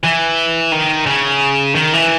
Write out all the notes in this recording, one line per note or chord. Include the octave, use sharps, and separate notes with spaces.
E3
D#3
C#3
D#3
E3